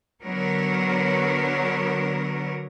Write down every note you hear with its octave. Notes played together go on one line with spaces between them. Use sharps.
D3 F#3 B3 A#4 C#5